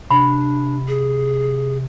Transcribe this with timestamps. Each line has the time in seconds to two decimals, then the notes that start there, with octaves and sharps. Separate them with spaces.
0.11 C3 D4 B5
0.88 G#4